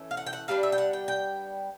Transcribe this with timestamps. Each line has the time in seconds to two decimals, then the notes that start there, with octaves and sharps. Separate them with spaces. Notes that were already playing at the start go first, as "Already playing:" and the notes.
Already playing: E3 A3 C#4
0.11 F5
0.17 F#5
0.27 G5
0.33 F#5
0.48 D3 G3 B3 D4 F5
0.63 E5
0.72 G5
0.78 F#5
0.93 G5
1.08 G5